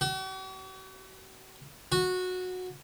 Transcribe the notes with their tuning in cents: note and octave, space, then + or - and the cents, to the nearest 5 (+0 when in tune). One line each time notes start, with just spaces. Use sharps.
F#4 +45
F#4 -15